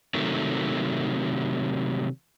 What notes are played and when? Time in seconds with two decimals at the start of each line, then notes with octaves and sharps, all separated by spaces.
0.14 C3 D#3 F#3 A3